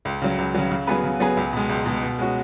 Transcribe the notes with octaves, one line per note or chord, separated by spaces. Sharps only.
C#2
C#3 F#3
C#2
C#3 F#3
C#3
F#3 B3 G#4 B4
C#3
F#3 B3 G#4 B4
C#2
B2 G#3
C#2
B2 G#3
B2
G#3 C#4 F#4